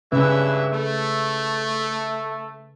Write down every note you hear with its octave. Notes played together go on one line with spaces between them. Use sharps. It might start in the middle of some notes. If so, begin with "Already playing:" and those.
G2 C#3 E3 C#4 B4 E5
A3